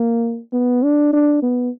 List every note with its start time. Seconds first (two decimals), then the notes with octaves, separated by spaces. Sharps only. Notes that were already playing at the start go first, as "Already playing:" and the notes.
Already playing: A#3
0.53 B3
0.83 D4
1.13 D4
1.42 B3